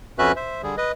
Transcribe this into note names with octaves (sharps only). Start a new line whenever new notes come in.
F2 C#4 F#4 B4 E5 F#6
C5 E5
D3 G3 G#4
B4 D#5